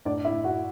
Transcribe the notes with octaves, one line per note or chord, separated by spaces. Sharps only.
A2 D4 D5
E4 E5
A2
F#4 F#5